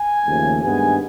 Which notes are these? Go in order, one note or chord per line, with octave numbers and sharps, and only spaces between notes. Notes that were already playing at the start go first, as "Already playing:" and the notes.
Already playing: G#5
D#2 C#3 F3 A3
G2 D#3 G#3 B3 G#5